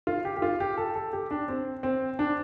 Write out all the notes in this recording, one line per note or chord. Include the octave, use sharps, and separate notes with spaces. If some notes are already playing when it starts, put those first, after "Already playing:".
F4
G4
G4
F4
G4
A4
A4
G4
D4
C4
C4
D4